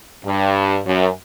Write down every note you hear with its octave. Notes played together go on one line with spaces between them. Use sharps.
G2
F#2